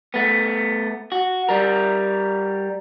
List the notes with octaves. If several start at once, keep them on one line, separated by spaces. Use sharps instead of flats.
A3 B3
F#4
G3 A#4